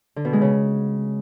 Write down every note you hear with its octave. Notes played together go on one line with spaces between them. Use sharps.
D3
B2
G#3
C#3